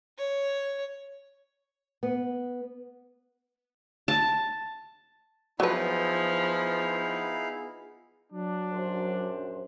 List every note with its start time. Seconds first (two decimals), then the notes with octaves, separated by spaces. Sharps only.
0.18 C#5
2.03 B3
4.08 A5
5.60 F3 F#3 B3 D#4 E4 G#4 B4 F5
8.32 F#3 D4
8.73 A#1 F#2 C5